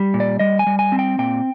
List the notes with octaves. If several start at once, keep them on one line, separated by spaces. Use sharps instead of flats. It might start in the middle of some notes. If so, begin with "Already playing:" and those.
Already playing: G3
A#2
D5
G3 D#5
G#5
G3
G#5
C4
G5
A#2 G5